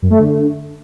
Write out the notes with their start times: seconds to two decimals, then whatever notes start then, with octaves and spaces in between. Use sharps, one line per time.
0.02 F#2
0.10 A3
0.19 D3